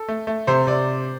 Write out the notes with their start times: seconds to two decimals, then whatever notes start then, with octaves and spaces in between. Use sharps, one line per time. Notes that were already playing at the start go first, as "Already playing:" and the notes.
Already playing: A4
0.08 A3
0.27 A3
0.47 C3 C5
0.67 C3 D5